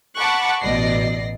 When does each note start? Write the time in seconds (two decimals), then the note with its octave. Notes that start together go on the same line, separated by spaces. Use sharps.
0.15 F#5 A5 B5 C#6 D6 F#6
0.60 A1 B2 D5 D#5 A#6 C7